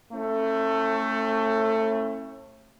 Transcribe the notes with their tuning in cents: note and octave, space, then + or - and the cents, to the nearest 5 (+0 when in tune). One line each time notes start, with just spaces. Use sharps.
A3 +20 C#4 -40 E4 -25